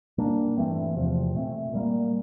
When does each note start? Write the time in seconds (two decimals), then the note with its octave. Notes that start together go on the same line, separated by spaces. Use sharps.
0.18 A#2 G3 A#3 D4
0.57 G2 E3 A3 C4
0.95 E2 C3 F3
1.34 A#2 A3 C4
1.73 A#2 G3 A#3